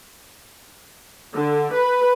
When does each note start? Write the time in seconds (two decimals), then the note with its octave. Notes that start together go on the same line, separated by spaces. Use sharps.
1.35 D3
1.73 B4